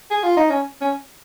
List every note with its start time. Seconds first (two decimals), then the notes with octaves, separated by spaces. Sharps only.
0.11 G#4
0.23 F4
0.37 D#4
0.50 C#4
0.81 C#4